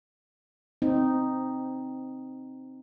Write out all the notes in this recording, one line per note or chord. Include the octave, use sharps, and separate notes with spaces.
C4 D#4